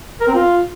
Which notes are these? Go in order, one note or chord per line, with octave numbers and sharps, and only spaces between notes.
A#4
C4
F4